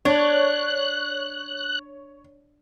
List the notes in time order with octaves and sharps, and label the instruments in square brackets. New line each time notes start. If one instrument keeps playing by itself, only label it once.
[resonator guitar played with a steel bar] D4 [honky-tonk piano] C#5 [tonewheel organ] F#6